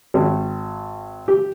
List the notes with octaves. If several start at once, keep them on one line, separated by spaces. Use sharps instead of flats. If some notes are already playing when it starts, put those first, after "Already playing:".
G#1
G4